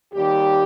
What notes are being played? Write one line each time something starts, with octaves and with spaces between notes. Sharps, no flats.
D#2 D#3 G3 G4